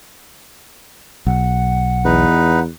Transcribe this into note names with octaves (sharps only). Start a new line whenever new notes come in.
B1 F#5
E2 D#4 B4